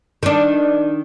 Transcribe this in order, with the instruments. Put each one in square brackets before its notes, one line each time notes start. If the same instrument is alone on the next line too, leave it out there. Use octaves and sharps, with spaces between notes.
[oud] D#3 D4